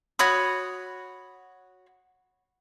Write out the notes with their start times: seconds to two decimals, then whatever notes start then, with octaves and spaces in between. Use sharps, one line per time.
0.19 F#4 C#5 B5 D#6